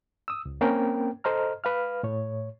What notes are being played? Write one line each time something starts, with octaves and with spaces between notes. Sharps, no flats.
D#6 E6
C#2
A#3 C4 C#4 A#4 G5
A4 C5 D#5 A#5 F6
B4 F5 F6
A2 C#5